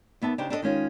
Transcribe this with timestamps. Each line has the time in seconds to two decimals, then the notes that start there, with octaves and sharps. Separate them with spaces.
0.22 D#2 B3 E5 A5
0.38 C#3 D4 D#4 G4 C5
0.50 D4 G4 A4 B4 D#5
0.62 D#3 G#3 C#4 F4